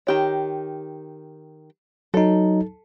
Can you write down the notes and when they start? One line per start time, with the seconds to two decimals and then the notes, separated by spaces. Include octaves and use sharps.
0.07 D#3 G4 C#5
2.14 F#3 D#4 A4